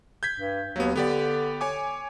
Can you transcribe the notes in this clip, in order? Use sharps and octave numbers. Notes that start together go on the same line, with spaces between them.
G6 G#6 B6
G2
D#2 F#3 B3
D3 B3 G4 D5
C#5 G#5 D6